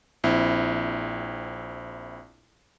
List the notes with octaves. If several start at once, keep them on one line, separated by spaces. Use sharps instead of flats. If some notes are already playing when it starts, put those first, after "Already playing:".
A#1 C4 E4